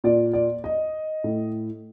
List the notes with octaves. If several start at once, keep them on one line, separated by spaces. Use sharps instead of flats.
A#2 D5
D5
D#5
A2